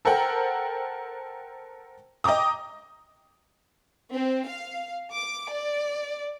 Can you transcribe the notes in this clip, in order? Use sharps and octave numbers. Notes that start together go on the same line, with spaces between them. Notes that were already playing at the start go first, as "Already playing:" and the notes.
A4 A#4 C5 F#5 G5
D#5 G5 A#5 D6 D#6
C4
F5
D6
D5